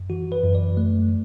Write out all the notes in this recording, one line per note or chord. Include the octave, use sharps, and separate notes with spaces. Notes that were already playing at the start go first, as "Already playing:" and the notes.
Already playing: F#2
E3 F#4
B4
F#2
D5
A3